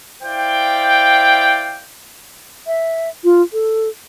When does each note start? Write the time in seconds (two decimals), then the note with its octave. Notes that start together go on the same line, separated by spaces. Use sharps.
0.23 E4 C5 D5 F5 G5
2.67 E5
3.24 F4
3.53 A4